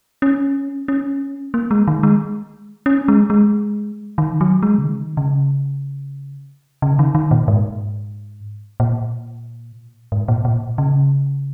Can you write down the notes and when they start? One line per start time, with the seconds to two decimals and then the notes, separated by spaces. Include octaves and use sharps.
0.22 C#4
0.88 C#4
1.54 A#3
1.71 G#3
1.88 D#3
2.03 G#3
2.86 C#4
3.08 G#3
3.30 G#3
4.18 D#3
4.41 F#3
4.63 G#3
4.78 C#3
4.84 D#3
5.17 C#3
6.82 C#3
6.99 D#3
7.15 D#3
7.31 A#2
7.48 G#2
8.80 A#2
10.12 G#2
10.28 A#2
10.45 A#2
10.78 C#3